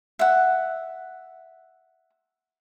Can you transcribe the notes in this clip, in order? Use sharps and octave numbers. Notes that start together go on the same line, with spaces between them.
E5 F#5